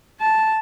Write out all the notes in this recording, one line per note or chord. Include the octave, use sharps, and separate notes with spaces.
A5